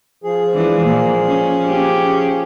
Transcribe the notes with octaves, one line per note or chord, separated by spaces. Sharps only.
F3 G#4
E3 G#3 D4
A#2 A#3
C#4
C#4 G4